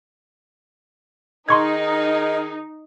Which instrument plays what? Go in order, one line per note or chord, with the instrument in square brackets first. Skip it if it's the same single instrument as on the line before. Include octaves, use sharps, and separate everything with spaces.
[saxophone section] D#3 G#4 [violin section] D#4 [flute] D#5 [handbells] C6 C#6 G#6